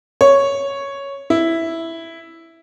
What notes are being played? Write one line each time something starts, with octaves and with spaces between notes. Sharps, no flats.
C#5
E4